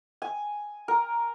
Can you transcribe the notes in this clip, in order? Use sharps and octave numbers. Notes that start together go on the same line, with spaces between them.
G#5
A#4